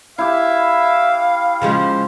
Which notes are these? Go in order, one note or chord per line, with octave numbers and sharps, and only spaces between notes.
E4 G4 E5 F5
C#3 F3 G#3 C5